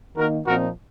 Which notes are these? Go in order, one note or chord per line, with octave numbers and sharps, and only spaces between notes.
D#3 A#3 D#4 F#4 A#4
A#2 F3 C4 D#4 F#4 A#4